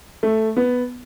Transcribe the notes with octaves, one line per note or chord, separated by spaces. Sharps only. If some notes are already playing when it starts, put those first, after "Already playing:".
A3
B3